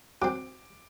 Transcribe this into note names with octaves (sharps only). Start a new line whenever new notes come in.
F#3 C4 D6